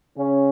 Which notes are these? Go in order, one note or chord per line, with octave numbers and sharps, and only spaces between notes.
C#3 C#4